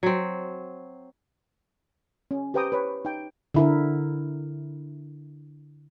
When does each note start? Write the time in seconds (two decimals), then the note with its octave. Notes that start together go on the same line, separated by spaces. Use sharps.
0.03 F#3 C4
2.31 C#4
2.54 G4 B4 C5 G5 A#5 D#6
2.72 B4 C#5
3.05 D#4 G5
3.54 D3 E4 A#4